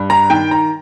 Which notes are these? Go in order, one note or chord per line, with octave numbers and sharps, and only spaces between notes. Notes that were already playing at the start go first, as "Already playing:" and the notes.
Already playing: G2
A#5
D#3 G5
A#5